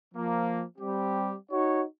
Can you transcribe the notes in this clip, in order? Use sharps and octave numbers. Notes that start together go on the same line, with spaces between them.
F3 A#3
G3 C4 G4
D#4 F#4 C#5